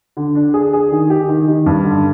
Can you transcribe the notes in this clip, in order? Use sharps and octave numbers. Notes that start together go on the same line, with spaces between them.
D3
D4
G#4
G#4
D#3
G4
D#3
D#3
G2
D3